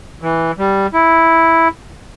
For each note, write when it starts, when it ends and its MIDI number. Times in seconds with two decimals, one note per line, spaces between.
0.22 0.51 52
0.59 0.87 55
0.94 1.68 64